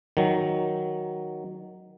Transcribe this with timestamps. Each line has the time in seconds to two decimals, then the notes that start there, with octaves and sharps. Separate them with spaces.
0.17 D#3 F#3